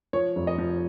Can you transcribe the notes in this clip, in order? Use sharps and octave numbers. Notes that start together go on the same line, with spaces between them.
F3 C#5
F1
D#5
F3